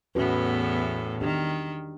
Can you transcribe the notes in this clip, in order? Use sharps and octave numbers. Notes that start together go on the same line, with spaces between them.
E2 A2 B3 C#4 F#4 B4
D#3 D4 G4